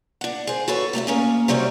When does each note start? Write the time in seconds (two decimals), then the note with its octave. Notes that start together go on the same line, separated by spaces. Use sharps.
0.21 D4 F#5
0.47 G#4 C5
0.68 F#4 A4 B4 C#5
0.93 C3 A3 D5 E5
1.07 A#3 C#4 G#4
1.48 C3 F#3 G3 C4 C#4